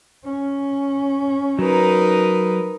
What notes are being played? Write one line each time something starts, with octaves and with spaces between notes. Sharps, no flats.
C#4
F#3 D#4 A#4 B4